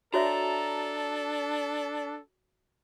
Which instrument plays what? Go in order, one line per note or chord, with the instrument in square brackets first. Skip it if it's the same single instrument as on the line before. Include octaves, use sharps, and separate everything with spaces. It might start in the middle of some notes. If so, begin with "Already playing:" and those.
[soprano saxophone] D4 [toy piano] F#4 C#5 E5 [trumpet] A4 [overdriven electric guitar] A#5